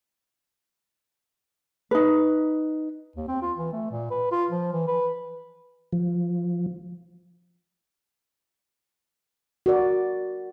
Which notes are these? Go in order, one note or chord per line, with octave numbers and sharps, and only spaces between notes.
D#4 B4
D#2
C4
F4
E3
A3
A#2
B4
F4
F3
E3
B4
F3
F#4 A#4 D5